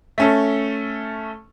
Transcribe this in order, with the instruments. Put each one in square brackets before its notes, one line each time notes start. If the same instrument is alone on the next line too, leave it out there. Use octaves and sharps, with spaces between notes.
[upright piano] A3 C#4 A4